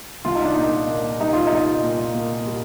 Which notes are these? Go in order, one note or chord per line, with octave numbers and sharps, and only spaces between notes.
C2 F4
D#4
D4
A#2 D#4
A#3
G3 D#4
F4
D#4
C2
A#2
A#3
G3